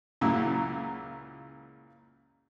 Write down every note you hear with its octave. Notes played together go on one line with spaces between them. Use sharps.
C#2 A#2 C#3 F#3 E4 E6